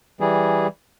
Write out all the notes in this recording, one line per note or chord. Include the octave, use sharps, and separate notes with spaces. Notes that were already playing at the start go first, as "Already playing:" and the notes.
E3 G3 G#4